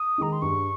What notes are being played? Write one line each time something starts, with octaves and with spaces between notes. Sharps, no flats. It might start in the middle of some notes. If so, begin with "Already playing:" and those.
Already playing: D#6
D#3 G#3 D#4 A#5
C6
G2 C#6